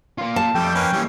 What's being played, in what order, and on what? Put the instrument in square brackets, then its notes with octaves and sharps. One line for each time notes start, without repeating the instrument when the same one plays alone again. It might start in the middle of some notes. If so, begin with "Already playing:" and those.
[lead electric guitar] A#3 F4
[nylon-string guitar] A5
[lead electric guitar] F2 [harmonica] G3 A3 [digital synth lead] G5
[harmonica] A#3 C#4 B4
[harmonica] E3 C#4 [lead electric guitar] G3 A#3